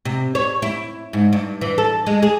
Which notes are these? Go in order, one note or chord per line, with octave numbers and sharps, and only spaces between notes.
C3
C#5
E4
G#2
G2
E3
A4
G#3
G#4